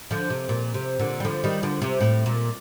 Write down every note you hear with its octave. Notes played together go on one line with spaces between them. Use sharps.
D3 F3
C3
A#2
C3
A#2 D3
G3
D3 F3
D#3 G3
D3 F3
C3
A2
A#2